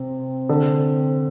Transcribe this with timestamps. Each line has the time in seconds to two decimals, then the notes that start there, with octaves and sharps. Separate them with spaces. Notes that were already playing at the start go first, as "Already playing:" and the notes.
Already playing: C3 C4
0.49 D3